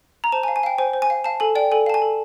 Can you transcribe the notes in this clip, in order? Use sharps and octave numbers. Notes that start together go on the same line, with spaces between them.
A#5
C5 A5
G#5
F5
G#5
F5 G5
C5 G#5
C5
G#5
F5
F5 A5
A4 G#5
D5 G5
A4 G#5
F5 A5
G#5
A4